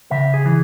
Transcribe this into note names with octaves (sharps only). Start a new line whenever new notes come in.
C#3 E5
G#4
E3